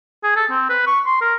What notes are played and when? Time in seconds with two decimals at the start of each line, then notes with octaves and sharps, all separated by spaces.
0.23 G#4
0.36 A4
0.50 C4
0.69 B4
0.87 C#6
1.06 C6
1.21 A#4